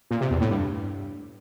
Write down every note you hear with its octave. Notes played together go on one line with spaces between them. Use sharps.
A#2
C3
E2
A2
G2